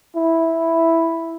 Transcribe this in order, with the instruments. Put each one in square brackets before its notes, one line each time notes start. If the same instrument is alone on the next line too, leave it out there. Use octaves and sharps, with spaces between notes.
[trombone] E4